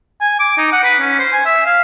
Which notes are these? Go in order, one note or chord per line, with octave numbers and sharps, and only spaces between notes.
G#5
D6
D#4
F#5
B4
C#4
C5
G#5
E5
F5